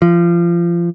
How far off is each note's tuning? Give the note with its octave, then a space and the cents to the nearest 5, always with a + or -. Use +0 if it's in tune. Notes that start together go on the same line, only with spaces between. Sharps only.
F3 -30